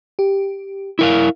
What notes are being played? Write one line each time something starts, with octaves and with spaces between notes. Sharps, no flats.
G4
E4 A#4 F5